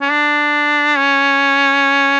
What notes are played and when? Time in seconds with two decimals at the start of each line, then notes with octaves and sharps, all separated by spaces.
0.01 C#4
0.10 D4
0.97 C#4